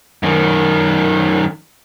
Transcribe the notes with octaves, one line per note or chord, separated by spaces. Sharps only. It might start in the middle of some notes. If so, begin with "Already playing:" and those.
F#2 D#3